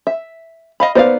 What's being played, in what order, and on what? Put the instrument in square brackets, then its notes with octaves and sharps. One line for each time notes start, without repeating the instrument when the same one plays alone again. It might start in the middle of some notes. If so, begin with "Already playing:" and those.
[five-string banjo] E5
D#5 F5 B5
[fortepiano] B3 C5 [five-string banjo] D#4 D5 F5